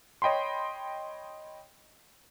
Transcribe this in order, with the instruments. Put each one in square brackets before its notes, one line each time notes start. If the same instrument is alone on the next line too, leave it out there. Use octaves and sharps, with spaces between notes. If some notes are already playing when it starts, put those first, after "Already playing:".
[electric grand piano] C#5 D#5 G5 B5 C6